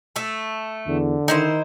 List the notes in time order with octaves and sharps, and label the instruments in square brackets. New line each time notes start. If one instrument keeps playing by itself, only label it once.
[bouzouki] A3 A4
[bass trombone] E2 [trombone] D3
[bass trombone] D#3 [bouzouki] D#4 E4 C5